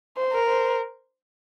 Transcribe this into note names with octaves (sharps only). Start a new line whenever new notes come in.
C5
A#4
C5